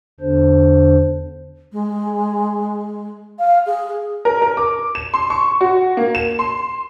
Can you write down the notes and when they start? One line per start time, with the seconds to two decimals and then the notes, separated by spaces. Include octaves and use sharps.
0.20 E2 D3 D4 C5
1.72 G#3
3.39 F5
3.66 G#4
4.25 A#4
4.42 A#4
4.57 D6
4.95 E7
5.14 C6
5.30 C#6
5.61 F#4
5.97 A#3
6.15 E7
6.39 C6